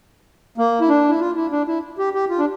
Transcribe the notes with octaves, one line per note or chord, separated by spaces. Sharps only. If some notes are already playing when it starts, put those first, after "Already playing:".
A#3
E4
D4
E4
F4
E4
D4
E4
G4
G4
F4
D4